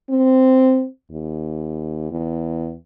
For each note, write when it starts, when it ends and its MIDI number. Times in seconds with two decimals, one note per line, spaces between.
0.10 0.86 60
1.12 2.10 39
2.12 2.74 40